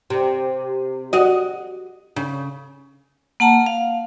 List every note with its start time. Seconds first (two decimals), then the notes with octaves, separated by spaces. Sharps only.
0.10 C3
1.13 F#4 D#5
2.16 C#3
3.40 A#3 F#5 A5 A#5
3.66 F5